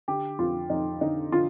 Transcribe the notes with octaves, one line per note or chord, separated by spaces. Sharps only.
D3 G4
F2 F4
F2 D#4
D3 D#4
D3 F4